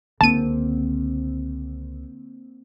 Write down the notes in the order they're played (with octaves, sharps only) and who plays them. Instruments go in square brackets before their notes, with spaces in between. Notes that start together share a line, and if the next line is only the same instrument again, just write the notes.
[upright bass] C#2 [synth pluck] D3 A#3 C4 [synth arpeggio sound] A5 D#7